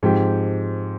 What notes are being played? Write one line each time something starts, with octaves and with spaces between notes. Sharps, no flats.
G#2 F3 C4 G4